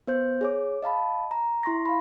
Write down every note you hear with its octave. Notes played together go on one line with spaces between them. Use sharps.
B3 C5 G6
G#4 C#5 D6
D#5 F5 A5 B5
A#5
E4 C6 C#6 A#6
F5 B5